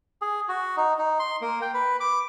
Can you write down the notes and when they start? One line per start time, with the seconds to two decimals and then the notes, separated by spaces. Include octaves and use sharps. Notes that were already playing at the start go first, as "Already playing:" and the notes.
0.22 G#4
0.48 F#4
0.77 D#4
0.99 D#4
1.19 C6
1.41 A#3
1.62 G5
1.74 B4
2.00 D6